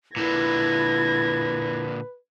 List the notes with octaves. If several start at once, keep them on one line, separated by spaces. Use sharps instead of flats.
A#2 D3 E4 B4 G#6 A#6